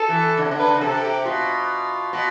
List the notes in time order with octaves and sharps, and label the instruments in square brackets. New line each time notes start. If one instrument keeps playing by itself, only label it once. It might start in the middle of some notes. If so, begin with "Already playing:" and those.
Already playing: [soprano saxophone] A4
[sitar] E3
D3
C3
D3
[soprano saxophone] B4
[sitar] D3
[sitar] C3 [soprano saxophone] A4
[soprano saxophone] G4
[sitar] B2 [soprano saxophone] F4
[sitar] B2